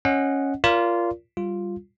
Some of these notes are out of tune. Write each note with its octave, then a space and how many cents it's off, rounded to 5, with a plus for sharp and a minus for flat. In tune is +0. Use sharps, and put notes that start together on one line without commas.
C#4 -10 D#5 +0 F#5 +0
F4 -15 A#4 +5 D5 -35
G3 +0 F4 +0